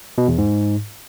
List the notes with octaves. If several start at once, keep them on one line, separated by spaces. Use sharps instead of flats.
B2
E2
G#2